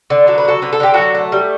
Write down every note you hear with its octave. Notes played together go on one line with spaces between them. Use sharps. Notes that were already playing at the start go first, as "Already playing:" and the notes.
D3
F#3 A4
B4
A3
F#4 A4
D3 B4
A4
D3 G4
F#3 F#4 A4
A3
G3